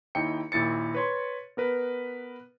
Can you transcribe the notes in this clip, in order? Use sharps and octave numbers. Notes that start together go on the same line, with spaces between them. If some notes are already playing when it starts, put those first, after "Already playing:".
D#2 D#4 E4 G5 C#7
D#2 A#2 E4 A6 C#7
B4 C#5 C6
B3 A#4 B4